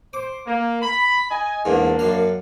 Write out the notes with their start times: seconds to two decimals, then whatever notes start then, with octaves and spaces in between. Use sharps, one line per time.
0.13 C5 D6
0.46 A#3
0.82 B5
1.30 D#5 G#5
1.65 E2 G#2 A#3 D4
1.99 F#2 F5